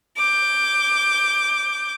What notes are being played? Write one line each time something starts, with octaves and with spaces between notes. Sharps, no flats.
D6 G6